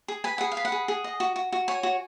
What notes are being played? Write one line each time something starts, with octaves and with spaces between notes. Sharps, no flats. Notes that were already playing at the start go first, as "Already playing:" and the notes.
G#4
B4 G#5
G#4 F#5
F5
B4
F#5
G#4
G#4
D#5
F#4
F#4
F#4
C#5 G#5
F#4